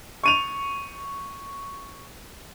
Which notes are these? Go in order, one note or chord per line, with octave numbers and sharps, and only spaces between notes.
C#6 D#7 F7